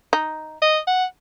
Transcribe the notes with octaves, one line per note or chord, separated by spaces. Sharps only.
D#4
D#5
F#5